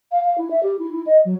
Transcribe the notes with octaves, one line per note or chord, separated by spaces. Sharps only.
F5
F5
E4
E5
G4
E4
E4
D#5
F#3